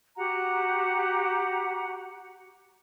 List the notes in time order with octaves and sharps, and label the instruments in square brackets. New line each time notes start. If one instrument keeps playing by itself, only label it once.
[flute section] F#4 G4 F#5 A#5